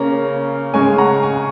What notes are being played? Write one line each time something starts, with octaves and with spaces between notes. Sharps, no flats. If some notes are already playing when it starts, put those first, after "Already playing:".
Already playing: C#3 A#3 C#4 A#5
C#3 G#3 C#4 G#5 C#6
F#5 A#5
G#5 C#6